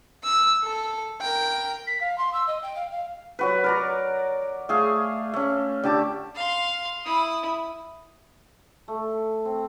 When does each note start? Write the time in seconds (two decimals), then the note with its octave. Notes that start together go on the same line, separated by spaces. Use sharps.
0.24 E6
0.64 A4
1.21 A#4 G5
1.87 B6
2.01 F5
2.18 C6
2.33 E6
2.47 D#5
2.62 G5
2.76 F5
2.92 F5
3.39 F#3 F#4 B4
3.64 A#4 D5 A#5
4.69 A3 G#4 F5
5.34 A3 C#4
5.84 D3 G4 A5 D6
6.35 F5 C6
7.05 E4 D#6
8.88 A3
9.45 C4